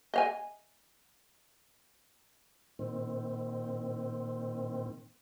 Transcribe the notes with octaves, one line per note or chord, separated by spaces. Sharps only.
D#5 F5 G#5
A#2 D#3 C4